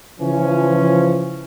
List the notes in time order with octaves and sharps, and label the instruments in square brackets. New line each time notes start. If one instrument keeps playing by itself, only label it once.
[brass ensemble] C#3 E3 F3 C#4